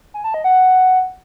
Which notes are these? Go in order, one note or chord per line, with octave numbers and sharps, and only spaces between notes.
G#5
A5
D#5
F#5